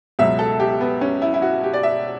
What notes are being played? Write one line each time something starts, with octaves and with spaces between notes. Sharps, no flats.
C#2 B2 F#3 E5
A4
G4
B3
C#4
E4
E4
F#4
G4
D5
E5